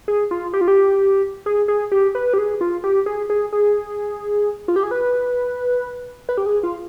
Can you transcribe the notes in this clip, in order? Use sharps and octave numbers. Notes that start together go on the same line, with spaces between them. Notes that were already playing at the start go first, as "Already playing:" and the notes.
G#4
F4
G4
F4
G4
G#4
G#4
G4
B4
G4
G#4
F4
G4
G#4
G#4
G#4
F4
G4
G#4
B4
B4
G4
G#4
F4